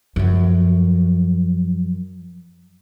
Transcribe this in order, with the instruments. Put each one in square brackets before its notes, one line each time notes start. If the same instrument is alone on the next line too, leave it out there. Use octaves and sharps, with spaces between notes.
[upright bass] F#2 F3